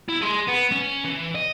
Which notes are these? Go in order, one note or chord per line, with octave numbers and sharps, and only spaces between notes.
E4
G#4 C6
B3
C#4
E3
D#5